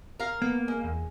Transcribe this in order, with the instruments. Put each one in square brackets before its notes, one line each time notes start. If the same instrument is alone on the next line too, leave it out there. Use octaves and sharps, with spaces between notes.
[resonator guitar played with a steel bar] A#4 F5
[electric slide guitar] A#3 [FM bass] B3
[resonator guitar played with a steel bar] G#3
[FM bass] E2